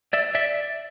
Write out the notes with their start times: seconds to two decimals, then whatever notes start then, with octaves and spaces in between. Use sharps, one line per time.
0.13 D5 E5
0.35 D5 E5